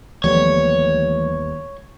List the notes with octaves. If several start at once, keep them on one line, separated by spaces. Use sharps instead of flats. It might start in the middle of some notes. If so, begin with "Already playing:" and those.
D#2 E3 F3 G3 A3 B3 C#5